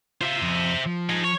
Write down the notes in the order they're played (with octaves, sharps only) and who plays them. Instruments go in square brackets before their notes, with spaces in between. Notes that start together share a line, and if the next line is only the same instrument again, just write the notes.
[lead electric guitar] F4 F5 [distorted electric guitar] C5 E5
[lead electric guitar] F2
F3
[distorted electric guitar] D#4 G#4
C#5